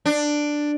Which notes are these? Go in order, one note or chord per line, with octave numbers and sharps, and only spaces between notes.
D4